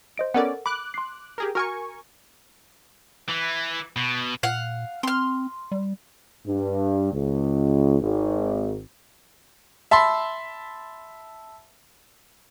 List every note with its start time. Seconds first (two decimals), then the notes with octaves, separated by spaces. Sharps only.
0.18 C5 D#5 D7
0.34 B3 C#4 A4 A#4 D5 F#5
0.66 B5 D6 F#6
0.94 C6 C7
1.38 G4 G#4 A#4
1.55 F#4 A#4 G#5 C#6 F6
3.29 E3
3.96 B2
4.43 A#2 F5 F#5
5.03 C4 C6 F6
5.72 G3
6.46 G2
7.12 C#2
8.01 G#1
9.91 E5 A5 B5 C6